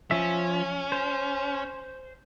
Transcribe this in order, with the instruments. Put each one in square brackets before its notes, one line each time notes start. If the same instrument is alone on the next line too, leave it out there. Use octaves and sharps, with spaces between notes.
[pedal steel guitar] F3 E5 [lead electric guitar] C#4
[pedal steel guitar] C5